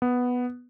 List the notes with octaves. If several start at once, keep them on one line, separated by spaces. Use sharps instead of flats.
B3